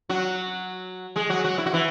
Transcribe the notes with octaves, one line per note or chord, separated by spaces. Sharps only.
F#3 F#4
G#3 G#4
F#3 F#4
F#3 F#4
E4
F#4
E3 E4